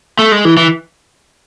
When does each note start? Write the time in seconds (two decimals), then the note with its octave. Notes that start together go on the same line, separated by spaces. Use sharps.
0.19 A3
0.32 G#3
0.45 E3
0.57 E3